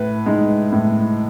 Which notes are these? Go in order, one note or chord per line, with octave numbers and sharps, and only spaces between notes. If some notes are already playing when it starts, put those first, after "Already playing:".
Already playing: A2 B4
G#3 D#4
A2